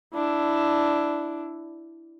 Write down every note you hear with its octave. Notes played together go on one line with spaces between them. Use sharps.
D4 E4